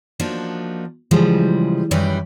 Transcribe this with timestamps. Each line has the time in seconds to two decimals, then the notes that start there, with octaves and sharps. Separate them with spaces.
0.20 F3 A#3 D4 D#4 F#4
1.11 C#3 E3 F3 G3 G#3
1.91 F#2 D#3 E3 G3 B4 D5